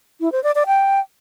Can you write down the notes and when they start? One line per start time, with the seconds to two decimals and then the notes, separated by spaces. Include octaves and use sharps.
0.21 E4
0.32 C5
0.44 D5
0.55 D5
0.67 G5